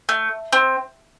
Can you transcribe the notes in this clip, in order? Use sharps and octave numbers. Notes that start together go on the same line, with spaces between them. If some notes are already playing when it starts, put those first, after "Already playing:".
A3
C4